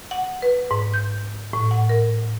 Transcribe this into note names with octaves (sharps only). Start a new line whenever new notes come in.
F#5
B4
G#2
G6
A2
F#5
A#4